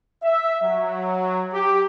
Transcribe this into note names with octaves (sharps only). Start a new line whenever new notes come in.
E5
F#3
G4